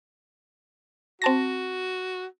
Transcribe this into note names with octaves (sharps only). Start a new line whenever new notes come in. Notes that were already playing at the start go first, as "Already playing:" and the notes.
C4 F#4 A5 A#6